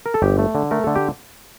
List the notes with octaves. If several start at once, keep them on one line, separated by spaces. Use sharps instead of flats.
A#4
A4
G1 G4
A3
D3
A3 A#4
D3 A4
G4